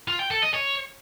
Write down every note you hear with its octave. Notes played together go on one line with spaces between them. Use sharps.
F4
G5
A4
D#5
C#5